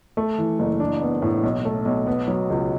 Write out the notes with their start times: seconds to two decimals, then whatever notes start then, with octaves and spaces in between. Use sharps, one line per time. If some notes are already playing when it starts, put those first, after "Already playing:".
0.17 A3
0.38 E3
0.59 F#1
0.80 D4
1.01 B3
1.22 A2
1.43 B1
1.65 A3
1.85 B1
2.07 B3
2.28 F#3
2.50 C#2